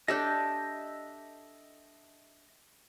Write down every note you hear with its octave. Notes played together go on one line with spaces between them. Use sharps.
D4 G4 A4 D#5 E5 G6